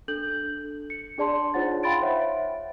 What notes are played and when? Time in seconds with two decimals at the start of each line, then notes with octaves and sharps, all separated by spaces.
0.08 D4 A4 G6 F#7
0.90 C#7
1.18 D4 G#4 D5 A5 C6
1.54 D#4 F4 C5 C#5 F#5 A6
1.83 F5 G5 B5 C6 A6 D7
2.01 C5 C#5 E5 F#5